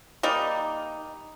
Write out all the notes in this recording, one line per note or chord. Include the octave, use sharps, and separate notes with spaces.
G3 A#3 D#4